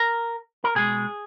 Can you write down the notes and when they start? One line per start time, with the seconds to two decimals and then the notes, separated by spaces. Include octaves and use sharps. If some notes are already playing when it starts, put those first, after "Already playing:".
Already playing: A#4
0.64 A#4
0.75 B2 G#3 G#4